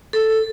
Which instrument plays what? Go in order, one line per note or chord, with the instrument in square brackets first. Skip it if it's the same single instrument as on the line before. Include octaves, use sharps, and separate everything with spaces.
[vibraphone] A4